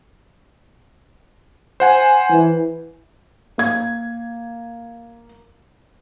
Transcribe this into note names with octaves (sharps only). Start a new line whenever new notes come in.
C5 F#5 G#5
E3
A#3 G#6